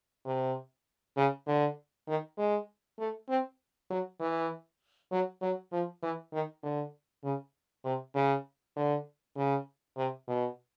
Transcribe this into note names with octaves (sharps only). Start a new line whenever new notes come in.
C3
C#3
D3
D#3
G#3
A3
C4
F#3
E3
F#3
F#3
F3
E3
D#3
D3
C#3
C3
C#3
D3
C#3
C3
B2